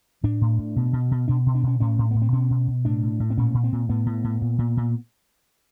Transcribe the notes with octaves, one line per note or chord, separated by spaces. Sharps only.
A2 D4
A2
A2
B2
B2
B2
B2 D4
B2
D4
B2 C#4
A2 C#4
A2
A2 B3
C4
B2 C#4
B2
B2
A2 D4
A2
A2
C4
A#2 C#4
A#2
C4
A#2
A2 B3
A2
A2
A#2
A#2
A#2